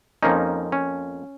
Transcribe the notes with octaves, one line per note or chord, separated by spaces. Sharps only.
F2 F3 A#3 C#4 D#4
C#4